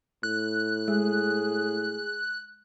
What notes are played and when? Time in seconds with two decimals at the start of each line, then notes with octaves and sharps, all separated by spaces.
0.23 A2 F#6
0.88 G#3 G#4